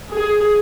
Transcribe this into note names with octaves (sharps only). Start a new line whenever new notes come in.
G#4